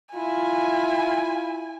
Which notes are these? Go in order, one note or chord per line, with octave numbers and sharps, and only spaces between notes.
E4 F4 G#5